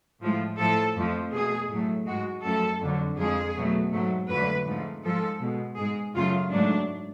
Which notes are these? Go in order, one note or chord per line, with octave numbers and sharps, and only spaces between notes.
A2 F3 G#3
A2 F3 A3 A4
F2 F3 A3
B2 A3 G#4
A2 F#3 A3
G#2 G#3 F#4
F#2 F3 A3 A4
F2 D3 F#3
F2 F3 G#3 G#4
B2 F#3 A3
G#2 F#3 A3
F2 D3 F#3 A3 B4
G#2 F3 A3
G#2 F3 G#3 A4
B2 G#3
G#2 G#3 G#4
F#2 C#3 F#3 A3 F4
G#2 F#3 A3 D4